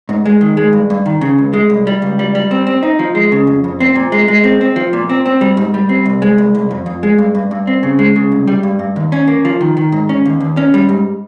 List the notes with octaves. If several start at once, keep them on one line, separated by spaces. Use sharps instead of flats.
G#2
G#3
D#3
G#3
G2
G2
D#3
C#3
C#2
G#3
C2
G3
C#2
G3
G3
C4
C4
D#4
F3
G#3
C#3
F2
F2
C4
A#2
G#3
G#3
C4
C4
F3
A#2
C4
C4
G3
G#2
G3
C4
C2
G#3
C2
C2
F2
F2
G#3
G2
G2
G2
C4
C#3
G#3
C#3
C2
G3
G2
G2
D#2
C#4
A#3
F3
D#3
D#3
G#2
C#4
D#2
D#2
C#4
G3
G#2